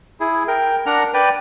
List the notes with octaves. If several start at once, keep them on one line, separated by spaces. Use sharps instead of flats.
E4 G#4
A#4 G5
D4 A#4 F#5 A#5
B4 D5 G5